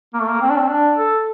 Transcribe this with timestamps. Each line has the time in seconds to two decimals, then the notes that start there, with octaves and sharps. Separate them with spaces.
0.14 A#3
0.21 A3
0.29 A#3
0.41 C4
0.50 D4
0.59 C4
0.69 D4
0.97 A4